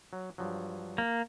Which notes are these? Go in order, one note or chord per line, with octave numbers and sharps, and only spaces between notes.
F#3
G2 F3 F#3
A#3